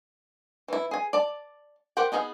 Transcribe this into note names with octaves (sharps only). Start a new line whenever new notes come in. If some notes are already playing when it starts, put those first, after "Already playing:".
E3 E4
G#4 G#5
D5 A5
G4 A#4 C5 F#5 G5
B3 D#4 G#4 A#4 F5